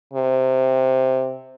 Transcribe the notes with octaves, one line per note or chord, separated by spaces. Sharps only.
C3